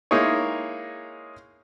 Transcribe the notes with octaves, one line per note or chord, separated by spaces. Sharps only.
G#3 A#3 D#4 E4 G#4 C#5